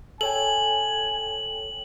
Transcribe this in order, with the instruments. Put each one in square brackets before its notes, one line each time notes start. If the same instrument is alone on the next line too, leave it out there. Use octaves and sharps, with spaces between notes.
[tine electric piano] A4 C#5 G5 [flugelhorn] G#5 [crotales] F#7